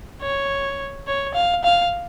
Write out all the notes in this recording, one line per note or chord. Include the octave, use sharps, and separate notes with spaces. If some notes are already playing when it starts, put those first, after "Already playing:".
C#5
C#5
F5
F5